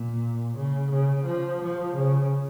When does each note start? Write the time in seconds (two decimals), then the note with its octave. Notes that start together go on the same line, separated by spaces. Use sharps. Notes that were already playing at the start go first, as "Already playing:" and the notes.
Already playing: A#2
0.57 C#3
0.92 C#3
1.26 F3
1.62 F3
1.97 C#3